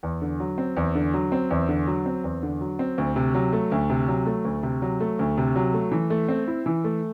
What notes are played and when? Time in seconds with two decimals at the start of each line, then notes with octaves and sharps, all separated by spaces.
0.03 E2
0.22 D3
0.40 F#3
0.58 C4
0.77 E2
0.95 D3
1.14 F#3
1.32 C4
1.51 E2
1.69 D3
1.87 F#3
2.06 C4
2.24 E2
2.43 D3
2.61 F#3
2.79 C4
2.98 D2
3.16 C3
3.34 F#3
3.53 A3
3.72 D2
3.90 C3
4.08 F#3
4.26 A3
4.45 D2
4.63 C3
4.82 F#3
5.00 A3
5.19 D2
5.38 C3
5.56 F#3
5.74 A3
5.92 E3
6.10 A3
6.28 C4
6.48 E4
6.66 E3
6.84 A3